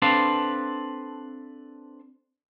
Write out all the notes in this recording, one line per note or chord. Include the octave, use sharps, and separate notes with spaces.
C4 D4 A4 B4 F5